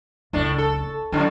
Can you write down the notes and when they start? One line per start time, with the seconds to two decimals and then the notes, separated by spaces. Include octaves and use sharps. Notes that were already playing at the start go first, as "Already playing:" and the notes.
0.33 F#1 C#2 A2 D4
0.58 A4
1.12 F#2 A2 D3 F#3